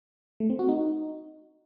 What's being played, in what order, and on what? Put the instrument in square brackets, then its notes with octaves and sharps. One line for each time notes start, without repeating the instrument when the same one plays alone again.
[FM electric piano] A3
C4
F#4
D#4